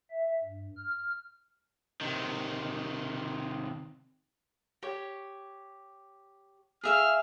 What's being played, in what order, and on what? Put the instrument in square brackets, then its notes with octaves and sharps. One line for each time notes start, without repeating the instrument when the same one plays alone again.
[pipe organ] E5
G2
F6
[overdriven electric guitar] C3 D#3
[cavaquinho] G4 C#5
[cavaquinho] G#4 E5 F5 [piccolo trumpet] F6